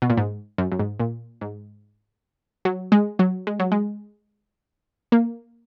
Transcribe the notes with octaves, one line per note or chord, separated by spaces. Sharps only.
B2
A#2
G#2
F#2
F#2
G#2
A#2
G#2
F#3
G#3
F#3
G#3
F#3
G#3
A#3